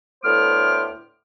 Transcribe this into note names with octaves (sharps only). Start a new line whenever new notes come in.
D2 A2 B3 C5 D6 F6